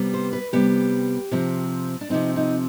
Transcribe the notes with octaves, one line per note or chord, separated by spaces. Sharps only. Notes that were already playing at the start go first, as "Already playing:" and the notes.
Already playing: C3 G3 B3
C5
B4
C3 G3 B3 G4
C3 F3 C4
D4
C3 F3 C4 D#4
D#4